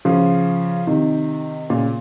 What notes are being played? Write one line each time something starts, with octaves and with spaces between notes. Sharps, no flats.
C#3 F3
C3 D#3
A#2 C#3